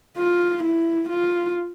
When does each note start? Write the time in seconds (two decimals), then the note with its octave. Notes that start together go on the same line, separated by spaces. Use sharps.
0.17 F4
0.63 E4
1.09 F4